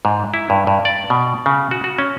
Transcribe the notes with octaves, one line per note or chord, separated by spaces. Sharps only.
G#2
E4
G2
G2
D5
B2
C#3
F#4
F#4
C#4